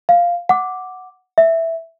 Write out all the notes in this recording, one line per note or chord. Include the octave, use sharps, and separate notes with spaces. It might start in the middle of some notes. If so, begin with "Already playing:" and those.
F5
F#5 D6
E5